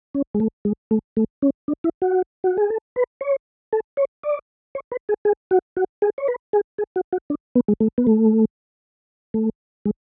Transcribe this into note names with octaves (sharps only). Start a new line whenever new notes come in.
C#4
G#3
A3
G#3
A3
A3
C#4
D4
E4
F#4
F#4
G#4
A4
B4
C#5
A4
C#5
D5
C#5
B4
G#4
G#4
F#4
F#4
G#4
C#5
B4
G#4
G#4
F#4
F#4
D4
B3
G#3
A3
B3
A3
A3
G#3